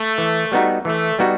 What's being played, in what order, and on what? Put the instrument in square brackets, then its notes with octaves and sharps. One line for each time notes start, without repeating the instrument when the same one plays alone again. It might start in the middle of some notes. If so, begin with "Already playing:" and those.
Already playing: [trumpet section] A3
[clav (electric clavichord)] E3
G3 B3 D#4 F#4
[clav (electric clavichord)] E3 [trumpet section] A3
[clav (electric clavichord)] G3 B3 D#4 F#4